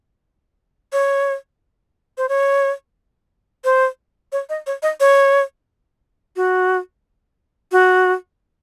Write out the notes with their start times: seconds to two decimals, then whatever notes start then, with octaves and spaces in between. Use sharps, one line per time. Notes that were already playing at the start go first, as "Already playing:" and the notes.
0.93 C#5
2.18 C5
2.29 C#5
3.64 C5
4.32 C#5
4.49 D#5
4.67 C#5
4.83 D#5
5.00 C#5
6.36 F#4
7.72 F#4